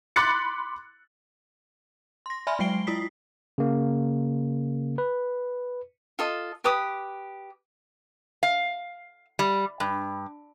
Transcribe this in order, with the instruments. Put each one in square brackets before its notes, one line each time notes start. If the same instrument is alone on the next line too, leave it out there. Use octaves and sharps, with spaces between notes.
[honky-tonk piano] B5 C6 D6 F#6 A6 C#7
[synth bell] C6 A#6
D5 E5 G#5 B5 C6 F6
F#3 G#3 G5 C7 D7 G7
E4 F4 D#6 B6 C7
[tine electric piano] C#3 A#3
B4
[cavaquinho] F4 A4 D#5
G4 B4 D6 D#6
[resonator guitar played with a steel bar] F5
G3
G2